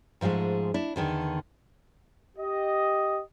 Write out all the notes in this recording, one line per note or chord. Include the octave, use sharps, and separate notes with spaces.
G#2 F3 F#3 G#3 A3
D4 E4
E2 D3 D#3
G4 D#5